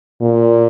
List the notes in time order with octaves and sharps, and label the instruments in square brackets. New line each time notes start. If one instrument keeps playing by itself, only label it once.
[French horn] A#2